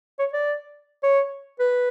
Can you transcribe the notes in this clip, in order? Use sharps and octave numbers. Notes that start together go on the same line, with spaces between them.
C#5
D5
C#5
B4